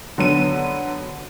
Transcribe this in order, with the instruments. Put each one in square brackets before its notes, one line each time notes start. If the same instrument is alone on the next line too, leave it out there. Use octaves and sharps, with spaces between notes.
[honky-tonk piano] D3 F#3 B3 D#7